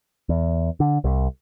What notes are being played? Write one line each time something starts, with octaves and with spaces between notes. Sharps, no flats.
E2
D3
C2